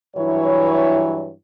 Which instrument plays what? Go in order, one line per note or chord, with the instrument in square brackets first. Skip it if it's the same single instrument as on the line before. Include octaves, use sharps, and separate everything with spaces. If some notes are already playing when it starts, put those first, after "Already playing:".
[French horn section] G2 E3 F#3 E4 C#5